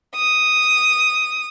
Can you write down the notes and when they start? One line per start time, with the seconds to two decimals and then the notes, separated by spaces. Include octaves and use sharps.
0.16 D#6